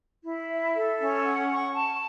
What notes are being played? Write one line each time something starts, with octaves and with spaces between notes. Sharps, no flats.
E4
E5
A4
C#4
F#5
C#6
A5